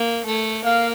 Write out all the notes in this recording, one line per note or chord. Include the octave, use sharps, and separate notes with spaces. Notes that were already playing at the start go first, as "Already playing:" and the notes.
Already playing: A#3
A3
A#3 F5